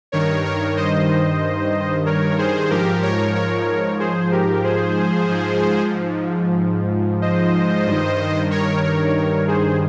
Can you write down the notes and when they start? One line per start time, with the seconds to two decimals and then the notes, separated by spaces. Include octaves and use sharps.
0.12 G2 D#3 A#4 C#5
0.45 A#4 C#5
0.77 C5 D#5
2.06 A#4 C#5
2.38 G#4 C5
2.70 G#2 F3 G4 A#4
3.02 A#4 C#5
3.35 A#4 C#5
3.99 G#4 C5
4.32 G4 A#4
4.64 G#4 C5
5.29 G#2 F3
7.22 C5 D#5
7.86 G2
7.91 D#3
8.51 A#4 C#5
8.83 A#4 C#5
9.16 A#4 C#5
9.48 G#4 C5